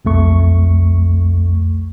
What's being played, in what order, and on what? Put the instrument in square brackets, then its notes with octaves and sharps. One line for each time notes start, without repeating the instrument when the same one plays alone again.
[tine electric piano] B1 F2 A3 C#6